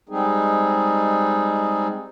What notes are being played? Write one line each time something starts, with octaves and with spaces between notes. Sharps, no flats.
G3 G#3 C4 D#4 G#4